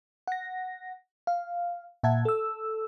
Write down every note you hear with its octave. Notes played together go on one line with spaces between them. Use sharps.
F#5 A#6
F5
A#2 E5 F#5 A5 G#6
A4 E6